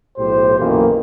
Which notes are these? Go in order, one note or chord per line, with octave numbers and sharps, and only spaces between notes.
B1 A2 G4 C5
B1 F#2 A#2 D#3 E3 A#3